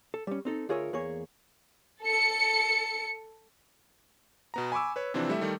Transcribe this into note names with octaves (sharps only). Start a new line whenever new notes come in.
A4
G3 C#4
C4 D#4 A4
D2 F4 G#4 A#4 C#5 E5
E2 A#3 G#4 C#5
A4 C#7
B2 B3 A#5
G#5 B5 C#6 D6 E6
B4 C#5
C3 E3 F3 C4 D4
G3 A3 E4 E5
D#3 G3 A3